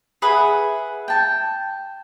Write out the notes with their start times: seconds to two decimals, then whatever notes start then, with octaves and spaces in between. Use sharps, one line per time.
0.22 G#4 B4 E5 F#5
1.08 G5 A5